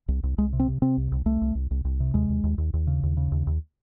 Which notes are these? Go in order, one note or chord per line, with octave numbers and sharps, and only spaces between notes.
C2
C2
C2 G#3
C3
C4
C3
C3 C4
C2
C2
C2 A3
C2
C2
C2
C2
C3
D#2 G#3
D#2
D#2
D#2
D#2
C#3
D#2
C#3
D#2
D#2